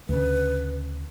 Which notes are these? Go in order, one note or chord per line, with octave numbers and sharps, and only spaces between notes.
D2 C#3 B4